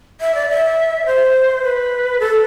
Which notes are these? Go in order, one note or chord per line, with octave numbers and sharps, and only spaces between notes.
E5
D5
E5
C5
B4
A4